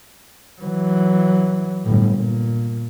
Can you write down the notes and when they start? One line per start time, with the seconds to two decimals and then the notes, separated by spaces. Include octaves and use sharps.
0.62 E3 F#3
1.85 G1 A2
2.16 A#2